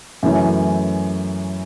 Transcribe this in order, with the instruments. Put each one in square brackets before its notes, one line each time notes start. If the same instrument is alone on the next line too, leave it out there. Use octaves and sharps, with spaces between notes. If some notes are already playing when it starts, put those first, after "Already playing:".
[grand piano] F#2 E3 A3 C#4 E4